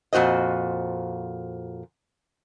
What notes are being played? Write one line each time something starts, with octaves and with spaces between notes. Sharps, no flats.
F2 A#2 F#4 C5 D#5